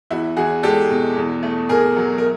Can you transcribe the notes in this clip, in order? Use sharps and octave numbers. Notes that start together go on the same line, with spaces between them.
E2 E4 F#4
E2 F#4 G#4
G#3 G4 A4
B2
E2
A3
B2 G#4 A#4
F#3
A#4